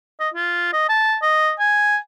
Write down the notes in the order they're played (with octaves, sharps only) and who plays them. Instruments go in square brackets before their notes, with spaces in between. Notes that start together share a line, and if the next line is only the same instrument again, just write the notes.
[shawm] D#5
F4
D#5
A5
D#5
G#5